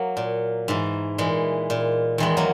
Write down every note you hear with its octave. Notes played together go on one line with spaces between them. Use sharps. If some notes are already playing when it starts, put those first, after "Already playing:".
Already playing: F#3 A#3
A#2
G#2 E3
A#2 E3 G#3
A#2
E2 D#3 E3 G#3
F#3 A#3